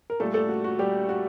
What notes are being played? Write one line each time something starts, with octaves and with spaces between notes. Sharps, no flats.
A#4
A#2 G3 A3 A4
A3 A4
F#4
F#4
G3 G4
F#4